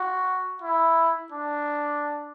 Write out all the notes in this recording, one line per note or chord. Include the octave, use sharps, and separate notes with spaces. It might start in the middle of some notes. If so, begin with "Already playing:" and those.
Already playing: F#4
E4
D4